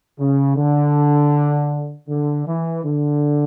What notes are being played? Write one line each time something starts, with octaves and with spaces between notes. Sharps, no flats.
C#3
D3
D3
E3
D3